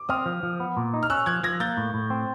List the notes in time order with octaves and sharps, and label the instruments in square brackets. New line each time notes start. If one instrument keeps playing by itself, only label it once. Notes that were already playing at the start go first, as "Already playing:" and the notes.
Already playing: [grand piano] D6
[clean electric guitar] C4 [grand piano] D#6 F6
[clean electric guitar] F3
F3
B3
A#2
D#4
[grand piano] F6
[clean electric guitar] C#4 [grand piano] E6 F#6
[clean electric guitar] F3 [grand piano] F#6 G#6
[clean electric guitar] F3 [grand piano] G#6 A#6
[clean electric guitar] A#3 [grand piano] G6 A6
[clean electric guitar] A2
A2
C4